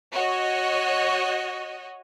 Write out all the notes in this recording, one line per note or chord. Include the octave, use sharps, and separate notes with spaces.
F#4 C#5 D#5